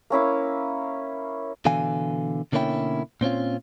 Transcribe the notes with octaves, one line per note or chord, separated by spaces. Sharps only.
A#3 C#4 E4 F5
B2 D3 E3 F5 G#5
B2 D3 A#3 C#4 E4 G5
A#2 C4 C#4 F4